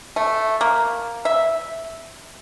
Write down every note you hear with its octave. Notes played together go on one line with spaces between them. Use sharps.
A3
A#3
E5